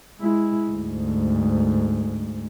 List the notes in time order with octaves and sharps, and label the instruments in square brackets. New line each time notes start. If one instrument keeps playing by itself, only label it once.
[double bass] G#3 E4
D2 G#2